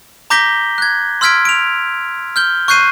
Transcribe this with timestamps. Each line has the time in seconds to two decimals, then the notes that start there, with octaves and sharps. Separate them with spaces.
0.30 A#5 D6 G6 A#6 B6 G7
0.78 F#6 G#6
1.21 C6 E6 F6 G#6 B6 D7
1.45 D7 F7
2.36 F6 G6 G7
2.68 C#6 F#6 G6 C7 D#7